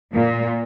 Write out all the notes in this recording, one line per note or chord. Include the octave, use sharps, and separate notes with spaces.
A#2